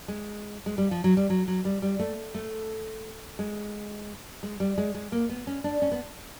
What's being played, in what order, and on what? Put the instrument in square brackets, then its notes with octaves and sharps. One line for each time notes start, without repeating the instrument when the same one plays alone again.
[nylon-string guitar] G#3
G#3
G3
F3
F#3
G3
F#3
F#3
G3
G3
A3
A3
G#3
G#3
G3
G#3
G#3
A#3
B3
C#4
D4
C#4
B3